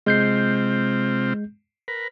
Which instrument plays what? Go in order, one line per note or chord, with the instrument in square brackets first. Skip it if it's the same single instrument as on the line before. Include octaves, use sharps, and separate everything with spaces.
[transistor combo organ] C3 C4 F4 [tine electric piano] G#3 G6 C7
[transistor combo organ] A#4 B4